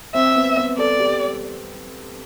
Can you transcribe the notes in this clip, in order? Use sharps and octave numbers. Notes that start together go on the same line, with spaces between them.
C4 E5
B3
B3
A4 D5
G4